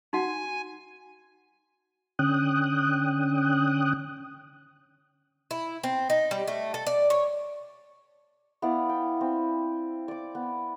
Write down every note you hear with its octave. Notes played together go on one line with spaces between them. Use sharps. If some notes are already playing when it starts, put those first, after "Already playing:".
D#4 F#4 F#5 G#5
D3 C#4 G5 D#6 F#6
E4
C4
D#4
G3
A3
A4
D5
C#5
B3 E4 D5 F5
G5
C4
D5 D6
B3